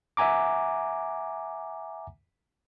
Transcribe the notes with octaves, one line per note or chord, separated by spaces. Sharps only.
E5 F#5 G#5 A#5 D6